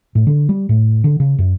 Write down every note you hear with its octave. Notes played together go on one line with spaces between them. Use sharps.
A2
D3
G3
A2
D3
C#3
F#2